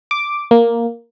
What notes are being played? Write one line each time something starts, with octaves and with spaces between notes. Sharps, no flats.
D6
A#3